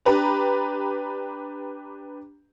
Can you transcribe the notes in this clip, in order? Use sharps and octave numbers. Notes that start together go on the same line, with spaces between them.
D4 G4 B4 A#5